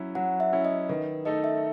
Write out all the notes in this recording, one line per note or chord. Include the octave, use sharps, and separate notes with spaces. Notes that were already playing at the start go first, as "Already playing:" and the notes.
Already playing: F#3 C#4 E4
F#3 F#5
E5
C#4 E4
D#5
D#3 B4
A3 D#4 A4 D#5
E5